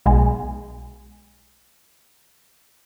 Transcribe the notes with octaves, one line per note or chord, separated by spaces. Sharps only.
B1 B2 G#3